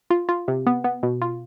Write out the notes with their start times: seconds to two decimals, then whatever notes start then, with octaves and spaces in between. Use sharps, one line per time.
0.10 F4
0.29 F4
0.48 C3
0.67 B3
0.84 B3
1.03 B2
1.22 F4